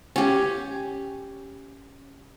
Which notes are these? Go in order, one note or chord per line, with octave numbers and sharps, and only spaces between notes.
C#4 G4